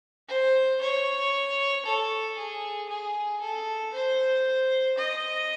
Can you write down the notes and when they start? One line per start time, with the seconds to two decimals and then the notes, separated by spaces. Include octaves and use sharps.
0.29 C5
0.81 C#5
1.85 A4
2.37 G#4
2.89 G#4
3.41 A4
3.94 C5
4.97 D#5